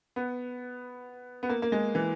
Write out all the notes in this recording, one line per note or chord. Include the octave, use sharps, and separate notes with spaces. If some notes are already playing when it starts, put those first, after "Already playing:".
B3
B3
A#3
A#3
G#3
E3